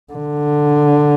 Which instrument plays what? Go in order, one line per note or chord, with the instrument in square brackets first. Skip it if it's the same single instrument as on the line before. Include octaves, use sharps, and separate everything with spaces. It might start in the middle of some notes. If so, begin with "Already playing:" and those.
[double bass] D3